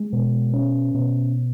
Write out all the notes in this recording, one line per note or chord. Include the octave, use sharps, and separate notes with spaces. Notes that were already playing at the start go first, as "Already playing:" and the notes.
Already playing: G#3
B2
C#4
B2